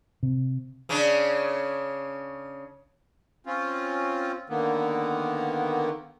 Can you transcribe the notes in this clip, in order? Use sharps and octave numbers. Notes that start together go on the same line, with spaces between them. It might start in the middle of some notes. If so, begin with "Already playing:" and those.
C3
C#3 C#4 D4
C4 C#4 F4
D3 D#3 A#3 B3